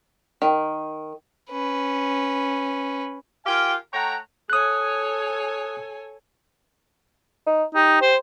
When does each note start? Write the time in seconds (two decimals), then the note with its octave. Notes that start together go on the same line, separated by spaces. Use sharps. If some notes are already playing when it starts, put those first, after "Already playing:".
0.42 D#3
1.50 C#4 B4
3.46 F4 G4 A#4 F5 G5 G#5
3.94 A3 C#5 F#5 G5 A#5
4.50 A4 C#5 G#5 D#6 F#6
7.46 D#4
7.75 D#4 G4
8.02 C5